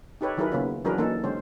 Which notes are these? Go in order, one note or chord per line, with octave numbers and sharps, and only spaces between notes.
D#4 G4 A4 B4 C#5
D#3 F#3 E4 G#4 A#4 B4
C#3 A#3 B3 C#4 F4
E3 F#3 D4 G#4 A#4 B4
E3 A#3 C#4 D#4 A4
D3 G#3 C#4 C5